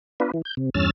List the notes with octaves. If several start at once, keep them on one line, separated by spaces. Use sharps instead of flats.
B3 D4 F4 B4
E3
G6
C3
E2 G2 C#4 E6 F6 A6